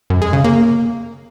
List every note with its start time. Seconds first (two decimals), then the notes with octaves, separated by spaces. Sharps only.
0.10 F#2
0.22 G#3
0.33 C#3
0.44 A#3